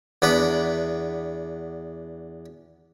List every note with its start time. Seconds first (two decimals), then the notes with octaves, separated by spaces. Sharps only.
0.22 E2 B3 D4 B4